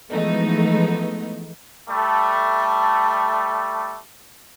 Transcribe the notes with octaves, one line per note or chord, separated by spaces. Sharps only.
E3 F3 G#3 A3 B3 D#4
G3 A3